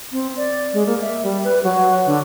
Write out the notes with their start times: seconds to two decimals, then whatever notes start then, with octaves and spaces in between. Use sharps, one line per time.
0.12 C4
0.37 D5
0.73 G#3
0.86 A#3
1.01 E5
1.23 G3
1.44 B4
1.64 F#3
2.06 D3